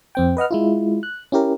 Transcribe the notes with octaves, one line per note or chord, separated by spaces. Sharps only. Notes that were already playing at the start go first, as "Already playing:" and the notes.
F2 C4 G5
B4 D#5 F#5 F6
G#3 E4 F4
F#6
C#4 E4 G4 A#4